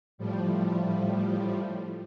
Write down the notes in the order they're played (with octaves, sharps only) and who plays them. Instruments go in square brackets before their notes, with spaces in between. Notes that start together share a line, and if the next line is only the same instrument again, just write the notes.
[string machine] A2 F3 G3